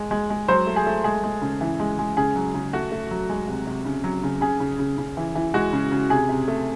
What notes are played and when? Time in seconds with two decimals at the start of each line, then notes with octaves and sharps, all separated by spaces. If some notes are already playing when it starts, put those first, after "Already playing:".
Already playing: G#3
0.11 G#3
0.30 G#3
0.48 F#3 C5
0.67 A3
0.76 G#4
0.86 A3
1.04 G#3 G#4
1.23 G#3
1.42 C#3
1.61 E3
1.80 G#3
1.99 G#3
2.17 C#3 G#4
2.36 F#3
2.54 C#3
2.73 A3 F#4
2.92 A3
3.11 F#3
3.29 G#3
3.47 C3
3.67 C3
3.85 C#3
4.04 F#3
4.23 C#3
4.41 C#3 G#4
4.60 C#3
4.79 C#3
4.98 C#3
5.17 E3
5.35 E3
5.54 G#3 F#4
5.73 C#3
5.92 C#3
6.10 C3 G#4
6.29 C3
6.48 A3